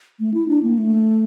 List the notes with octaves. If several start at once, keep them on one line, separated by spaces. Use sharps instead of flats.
A3
E4
D4
A#3
A3